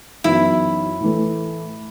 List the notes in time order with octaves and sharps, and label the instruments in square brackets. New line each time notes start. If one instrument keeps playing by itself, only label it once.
[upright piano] F#2 E3 B3 D#4 [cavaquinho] E4
[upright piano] A2 E3 A3